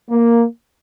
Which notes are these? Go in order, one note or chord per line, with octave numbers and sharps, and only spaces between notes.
A#3